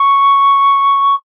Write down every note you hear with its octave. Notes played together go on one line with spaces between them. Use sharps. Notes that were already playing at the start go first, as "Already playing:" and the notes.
Already playing: C#6